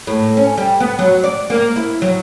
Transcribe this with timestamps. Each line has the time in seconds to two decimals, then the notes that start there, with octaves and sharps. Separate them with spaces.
0.07 A2
0.37 C#4
0.58 G3
0.80 B3
0.99 F#3
1.24 D5
1.50 A#3
1.76 E4
2.02 F#3